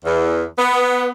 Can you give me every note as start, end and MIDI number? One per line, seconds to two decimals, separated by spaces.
0.05 0.43 40
0.56 1.08 59